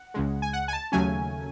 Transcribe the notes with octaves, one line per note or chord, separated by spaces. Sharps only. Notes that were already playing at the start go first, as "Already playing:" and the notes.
Already playing: F#5
C#2 C#3 G#3
G#5
F#5
G#5
A5
D#2 C#3 F#3 A3 C#4 G#5